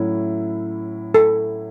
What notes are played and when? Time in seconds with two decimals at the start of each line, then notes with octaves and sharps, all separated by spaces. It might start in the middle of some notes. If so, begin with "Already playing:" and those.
Already playing: A2 F#3 C#4 E4
1.14 A4